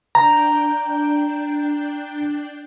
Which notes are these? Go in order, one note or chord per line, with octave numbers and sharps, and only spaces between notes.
D4 G5 A#5